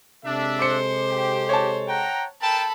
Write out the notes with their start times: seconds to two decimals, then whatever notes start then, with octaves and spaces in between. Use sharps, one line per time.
0.25 C3 G#3 D4 A4 E5
0.59 C5 D6 C#7
1.09 G4
1.49 C#5 A5
1.88 F#5 G5 A#5
2.42 A4 A#4 G5 A5 B5